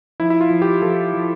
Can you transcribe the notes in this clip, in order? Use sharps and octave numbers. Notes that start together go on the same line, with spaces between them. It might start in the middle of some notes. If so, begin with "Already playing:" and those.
F3 E4
E4
F4
F3
G4
F3 A4
F3